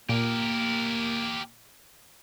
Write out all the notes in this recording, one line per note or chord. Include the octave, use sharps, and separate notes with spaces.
A#2 A#3 G4 A#4